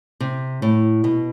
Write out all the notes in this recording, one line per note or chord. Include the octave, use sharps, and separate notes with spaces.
C3
A2
B2